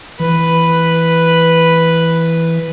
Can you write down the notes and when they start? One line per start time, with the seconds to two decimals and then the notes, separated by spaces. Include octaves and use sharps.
0.20 E3 B4